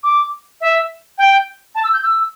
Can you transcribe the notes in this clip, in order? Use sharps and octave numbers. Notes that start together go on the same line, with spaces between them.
D6
E5
G5
A5
E6
G6
E6